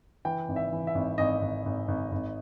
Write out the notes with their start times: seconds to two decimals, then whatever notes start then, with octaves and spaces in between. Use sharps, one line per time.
0.25 E3 G5
0.48 G#1
0.56 E5
0.72 E3
0.87 E5
0.95 G#1
1.18 G#1 D#5
1.41 G#1
1.66 G#1
1.88 G#1
2.12 G#1